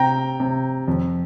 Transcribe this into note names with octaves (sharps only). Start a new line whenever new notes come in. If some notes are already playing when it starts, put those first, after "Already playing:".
Already playing: C3 G5 A#5
C3
F2